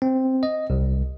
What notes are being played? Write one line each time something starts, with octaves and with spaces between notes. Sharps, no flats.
C4
D#5
C2